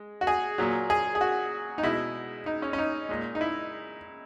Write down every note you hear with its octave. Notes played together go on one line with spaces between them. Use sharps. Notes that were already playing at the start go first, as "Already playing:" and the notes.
Already playing: G#3
F#4
G#4
A#2 F#3
G#4
G#4
F#4
D#4
B2 G#3 E4
D#4
C#4
C#4
D#4
A#2 G#3
D#4
E4